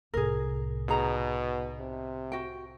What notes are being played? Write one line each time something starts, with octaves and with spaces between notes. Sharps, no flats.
C2 A2 G#4 A#4
B2 D#4 G#4 A#5
C3
F#4 G5